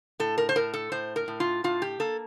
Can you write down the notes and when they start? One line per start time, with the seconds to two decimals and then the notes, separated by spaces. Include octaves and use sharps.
0.20 A2 A4
0.38 A#4
0.49 C5
0.56 A2 A#4
0.74 A4
0.92 A2 C5
1.16 A#4
1.28 A2
1.40 F4
1.64 A2 F4
1.82 G4
2.00 A#3 A4